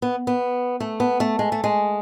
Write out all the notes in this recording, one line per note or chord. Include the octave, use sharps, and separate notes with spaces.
B3
B3
A3
B3
A3
G#3
A3
G#3